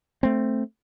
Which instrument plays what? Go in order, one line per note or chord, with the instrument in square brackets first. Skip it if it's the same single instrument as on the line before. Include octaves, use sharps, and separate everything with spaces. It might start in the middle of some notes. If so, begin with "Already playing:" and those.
[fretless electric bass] A3 C4